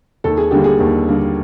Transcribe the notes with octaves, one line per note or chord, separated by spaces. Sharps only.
D#2 A4
G#4
D3 G3 A#3 G4
G#4
D#2
D3 G3 A#3